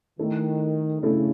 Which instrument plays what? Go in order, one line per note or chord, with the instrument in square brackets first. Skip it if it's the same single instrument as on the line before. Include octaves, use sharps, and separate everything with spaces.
[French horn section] D#3 [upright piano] A3 E4 A4
[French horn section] C#3 [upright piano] A3 E4 A4